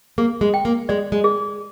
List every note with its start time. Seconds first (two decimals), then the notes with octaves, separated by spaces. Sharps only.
0.18 A#3 G#4
0.41 G#3
0.54 G5
0.65 A#3
0.89 G#3 D5
1.12 G#3
1.24 G#4